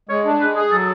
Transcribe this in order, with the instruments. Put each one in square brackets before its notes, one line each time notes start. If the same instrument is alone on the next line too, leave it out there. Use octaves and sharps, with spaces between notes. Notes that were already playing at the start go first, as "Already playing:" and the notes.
[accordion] G#3 [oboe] C#5
[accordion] D4
[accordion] G#3 [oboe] B4
[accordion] G#4
[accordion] F#3 [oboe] A4